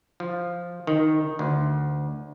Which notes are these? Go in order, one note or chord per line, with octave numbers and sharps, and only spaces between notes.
F3
D#3
D2